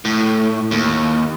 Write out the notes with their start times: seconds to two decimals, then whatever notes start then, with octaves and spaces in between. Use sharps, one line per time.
0.05 A2
0.71 D#2